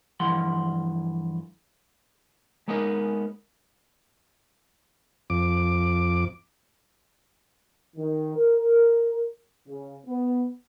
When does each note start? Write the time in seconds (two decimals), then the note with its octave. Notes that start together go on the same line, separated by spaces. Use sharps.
0.20 G2 E3 F3 F#5 C6
2.68 G#3 A#3 B3 C#4 D#4 A#4
5.30 F2 D6
7.96 D#3
8.36 A#4
9.67 C#3
10.06 B3